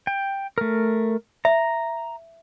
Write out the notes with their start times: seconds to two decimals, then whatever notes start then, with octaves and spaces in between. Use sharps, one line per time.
0.07 G5
0.58 A3 A#4
1.45 E5 A#5